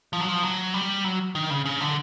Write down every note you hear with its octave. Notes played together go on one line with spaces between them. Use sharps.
F3
F#3
F3
F#3
G3
F#3
D#3
C#3
C#3
D3